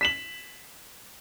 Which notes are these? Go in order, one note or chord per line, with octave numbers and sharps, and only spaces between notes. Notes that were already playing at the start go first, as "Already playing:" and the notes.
B6 E7 F#7